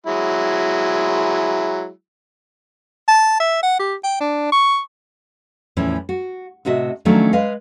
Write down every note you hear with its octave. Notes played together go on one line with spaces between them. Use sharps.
F#3 G#3 E4
A5
E5
F#5
G4
G5
D4
C#6
E2 A2 E3 F3 C#4
F#4
A2 C3 F#4 D#5 E5
D#3 F3 F#3 A3 C#4 D4
G#3 B4 D#5 F5